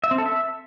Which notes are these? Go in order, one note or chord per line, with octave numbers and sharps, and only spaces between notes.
E5
C4
A4
E5